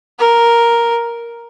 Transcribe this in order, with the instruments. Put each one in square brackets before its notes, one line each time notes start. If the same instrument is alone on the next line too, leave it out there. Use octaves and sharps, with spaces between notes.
[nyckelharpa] A#4